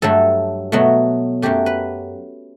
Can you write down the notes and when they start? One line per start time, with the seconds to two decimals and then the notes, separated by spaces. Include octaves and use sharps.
0.02 G2 F#3 A3 A4
0.72 B2 F#3 A3
1.42 F#2 F#3 A3 G4
1.66 B4